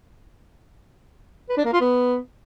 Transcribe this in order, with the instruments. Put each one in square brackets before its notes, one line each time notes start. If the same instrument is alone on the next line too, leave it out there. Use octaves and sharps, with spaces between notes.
[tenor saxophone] B4
D4
A#3
F4
B3